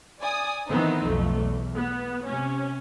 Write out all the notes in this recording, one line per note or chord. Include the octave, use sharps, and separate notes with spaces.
D5 G#5 D#6
D#3 E3 B3 C4 D#4
B1 F2 A3
E2
B3
C3 C#4